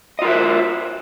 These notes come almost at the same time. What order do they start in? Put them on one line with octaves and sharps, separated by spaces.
D#5 F4 A#4 E5 C5